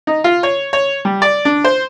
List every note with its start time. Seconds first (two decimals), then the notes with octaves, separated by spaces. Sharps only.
0.07 D#4
0.24 F4
0.43 C#5
0.73 C#5
1.05 G3
1.22 D5
1.45 D4
1.64 C5